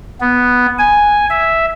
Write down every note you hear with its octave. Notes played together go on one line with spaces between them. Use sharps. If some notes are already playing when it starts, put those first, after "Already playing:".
B3
G#5
E5